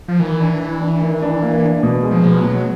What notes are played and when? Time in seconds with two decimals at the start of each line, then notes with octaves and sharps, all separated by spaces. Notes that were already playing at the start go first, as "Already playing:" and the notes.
0.08 F3
0.19 D#3 E3
0.40 D4
0.60 D4
0.81 D4
1.01 D#3
1.22 D4
1.42 A#3
1.62 D4
1.83 B2
2.03 G#3
2.11 F3
2.25 B2
2.37 F#3
2.44 B2